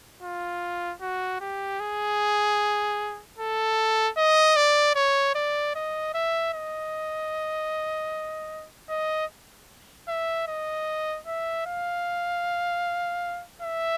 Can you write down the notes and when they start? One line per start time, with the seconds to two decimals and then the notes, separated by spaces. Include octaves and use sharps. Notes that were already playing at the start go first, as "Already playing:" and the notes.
0.23 F4
1.02 F#4
1.41 G4
1.80 G#4
3.38 A4
4.17 D#5
4.56 D5
4.96 C#5
5.35 D5
5.75 D#5
6.14 E5
6.54 D#5
8.90 D#5
10.08 E5
10.48 D#5
11.27 E5
11.66 F5
13.63 E5